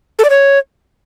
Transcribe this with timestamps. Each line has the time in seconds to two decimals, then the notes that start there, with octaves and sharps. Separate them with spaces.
0.19 A4
0.24 D5
0.30 C#5